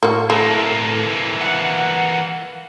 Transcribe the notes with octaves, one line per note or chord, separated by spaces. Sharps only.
A2 A#3 F#4
E3 A3 A#3
F#5